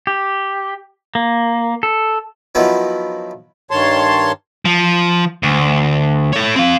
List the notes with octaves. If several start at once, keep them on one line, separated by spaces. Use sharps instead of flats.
G4
A#3
A4
D#3 F3 F#3 B3 E4
G2 D#3 C#5 A5 C6
F3
D2
A4 C#5
C4 F5